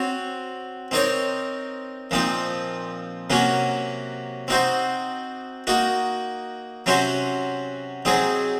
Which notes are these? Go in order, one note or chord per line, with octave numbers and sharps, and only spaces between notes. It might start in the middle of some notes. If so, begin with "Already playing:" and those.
Already playing: C4 F#4 C#5
C4 D#4 A#4 C#5
A#2 F3 C4 D#4
C3 F#3 A#3 C#4 F#4
C4 D#4 F#4 C5
A#3 D#4 F#4
C3 F#3 C#4 F#4 C5
F#3 C4 D#4 G#4